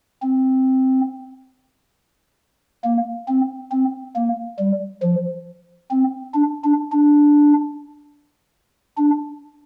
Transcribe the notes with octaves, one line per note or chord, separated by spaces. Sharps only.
C4
A#3
C4
C4
A#3
G3
F3
C4
D4
D4
D4
D4